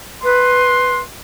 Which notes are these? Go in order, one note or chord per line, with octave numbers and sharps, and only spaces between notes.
B4 C6